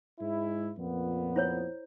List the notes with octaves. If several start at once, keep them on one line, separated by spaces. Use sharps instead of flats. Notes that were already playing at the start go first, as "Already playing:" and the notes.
G#2 G#3 E4
F2 A#2 B3
E4 C5 C#5